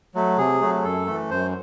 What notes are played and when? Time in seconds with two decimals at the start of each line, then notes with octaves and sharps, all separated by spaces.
0.15 F#3 A3
0.38 C3 G#4
0.61 F#3 A3
0.84 F#2 A4
1.07 E3 A3
1.30 F#2 C5